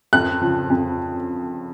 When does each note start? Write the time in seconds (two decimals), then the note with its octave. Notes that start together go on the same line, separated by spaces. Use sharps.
0.13 F2 F#6
0.41 C#3 F3
0.70 F2